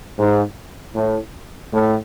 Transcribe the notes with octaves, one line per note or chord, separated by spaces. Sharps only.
G#2
A2
A2